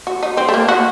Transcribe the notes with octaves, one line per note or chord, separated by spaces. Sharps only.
F#4
D#4
C4
A3
A#3
F#4